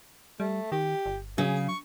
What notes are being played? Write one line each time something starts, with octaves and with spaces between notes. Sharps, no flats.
G3 A3
D#3 G4
G1
C#3 F#3 G#4
C#6